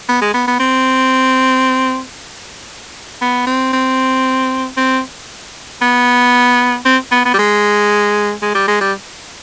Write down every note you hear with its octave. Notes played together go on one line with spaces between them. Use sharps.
B3
G#3
B3
B3
C4
B3
C4
C4
C4
B3
C4
B3
B3
G3
G#3
G#3
G3
G#3
G3